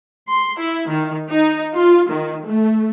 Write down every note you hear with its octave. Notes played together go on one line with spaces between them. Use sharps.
C6
E4
D#3
D#4
F4
D#3
A3